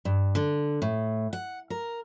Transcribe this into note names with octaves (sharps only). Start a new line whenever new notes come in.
G2
D3
A2
F#5
A#4